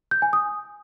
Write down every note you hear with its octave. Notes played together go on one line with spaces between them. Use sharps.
G6
G#5
D#6